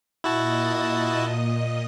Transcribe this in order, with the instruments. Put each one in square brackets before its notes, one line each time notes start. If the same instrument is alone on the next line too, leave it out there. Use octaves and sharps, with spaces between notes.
[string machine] A#2 D#5 D#6 [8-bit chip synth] E4 F#4 A5